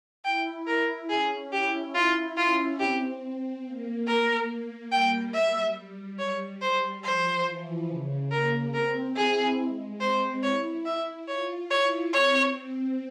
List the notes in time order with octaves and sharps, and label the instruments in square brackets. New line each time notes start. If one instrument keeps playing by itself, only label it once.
[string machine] E4 [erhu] G5
[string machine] E4 [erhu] A#4
[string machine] C#4 [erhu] G#4
[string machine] E4 [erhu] G4
[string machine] E4 [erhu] F4
[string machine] C#4 [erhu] F4
[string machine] C4 [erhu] G4
[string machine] A#3
[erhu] A#4
[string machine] G3 [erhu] G5
[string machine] G3 [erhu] E5
[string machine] G3
[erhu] C#5
[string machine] G3 [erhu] C5
[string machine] F3 [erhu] C5
[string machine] E3
C#3
[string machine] A#3 [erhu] A#4
[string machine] C4 [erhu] A#4
[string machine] E4 [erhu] G#4
[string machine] G#3
[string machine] C4 [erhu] C5
[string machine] E4 [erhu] C#5
[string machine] E4 [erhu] E5
[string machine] F4 [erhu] C#5
[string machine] E4 [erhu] C#5
[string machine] C4 [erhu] C#5